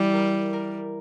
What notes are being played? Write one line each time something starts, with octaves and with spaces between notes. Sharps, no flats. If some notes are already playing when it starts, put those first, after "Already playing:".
Already playing: E3 G3 E4
A#4
A#4